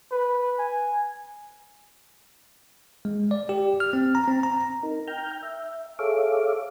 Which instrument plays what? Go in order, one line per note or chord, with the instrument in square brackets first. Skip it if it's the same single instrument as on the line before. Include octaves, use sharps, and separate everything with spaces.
[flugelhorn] B4
G#5
[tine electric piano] G#3
D5
G4
F6
C4
A#5
C4
A#5
[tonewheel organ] D#4 A#4
G5 A#5 F6 G6
E5
G#4 A4 C#5 E5 F5 D6